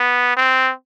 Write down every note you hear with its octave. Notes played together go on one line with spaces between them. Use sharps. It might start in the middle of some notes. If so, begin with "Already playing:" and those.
Already playing: B3
C4